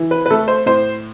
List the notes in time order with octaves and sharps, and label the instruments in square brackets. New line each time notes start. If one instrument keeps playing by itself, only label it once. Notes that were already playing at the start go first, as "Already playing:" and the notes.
Already playing: [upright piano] E3
B4
B4
A3 A4
C5
A2 C5